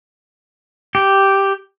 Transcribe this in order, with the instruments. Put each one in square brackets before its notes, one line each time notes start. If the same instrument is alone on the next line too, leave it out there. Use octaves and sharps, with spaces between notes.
[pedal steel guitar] G4